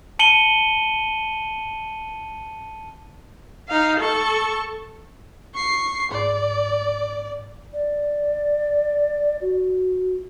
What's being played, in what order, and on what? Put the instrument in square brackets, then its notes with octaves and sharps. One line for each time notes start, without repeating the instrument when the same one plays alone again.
[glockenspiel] A5 C#7 D#7 F#7 G7
[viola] D#4 F5
A4 C#6
[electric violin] C#6 C7
[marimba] G#2 [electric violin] D5
[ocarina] D5
F#4